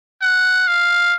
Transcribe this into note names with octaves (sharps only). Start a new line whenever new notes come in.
F#5
F5